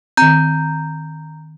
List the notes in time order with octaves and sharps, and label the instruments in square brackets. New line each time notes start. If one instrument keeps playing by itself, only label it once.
[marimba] D#3 C4 [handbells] A#5 G6